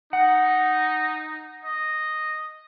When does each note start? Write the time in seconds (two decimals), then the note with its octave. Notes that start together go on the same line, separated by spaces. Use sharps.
0.13 D#4 F#5
1.65 D#5